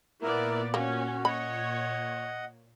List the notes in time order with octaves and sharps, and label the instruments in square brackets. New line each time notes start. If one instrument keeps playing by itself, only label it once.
[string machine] A#2 [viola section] A#3 B3 D5 [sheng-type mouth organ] E4 A#4
[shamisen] A#3 [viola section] C#4 [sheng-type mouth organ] F#4
[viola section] C#5 [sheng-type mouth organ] D#5 F#5 [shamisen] B5